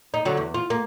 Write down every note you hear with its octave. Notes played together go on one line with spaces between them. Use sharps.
D#4
D3 F#3 F#4
E2
F4
A#3